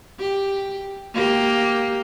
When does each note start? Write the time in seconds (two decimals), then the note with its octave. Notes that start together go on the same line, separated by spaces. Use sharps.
0.19 G4
1.14 A#3 G4